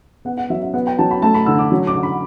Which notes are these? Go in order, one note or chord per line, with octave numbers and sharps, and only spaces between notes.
B3 F#5
F#5
F#3 E5
E5
B3 F#5
G5
F#3 A5
B5
A3 A5
B5
D3 E6
D6
F#3
D6
D3
B5